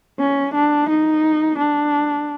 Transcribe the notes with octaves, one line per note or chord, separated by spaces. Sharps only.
C#4
D4
D#4
D4